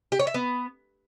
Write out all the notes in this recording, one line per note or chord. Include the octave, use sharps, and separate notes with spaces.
G4
C#5
E5
B3